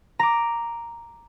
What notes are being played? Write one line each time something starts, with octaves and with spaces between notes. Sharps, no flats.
A#5 D6